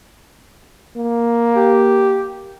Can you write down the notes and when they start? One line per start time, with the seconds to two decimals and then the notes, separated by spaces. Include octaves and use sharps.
0.97 A#3
1.56 G4